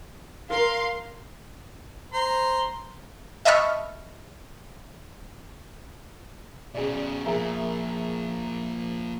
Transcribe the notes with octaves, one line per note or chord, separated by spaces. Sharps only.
A#4 F5 C6
C5 A#5 C6
D#5 E5 A5 B5 C#6 F6
B2 C#4 G#4 D5
A#2 F3 G#4 A#4 E5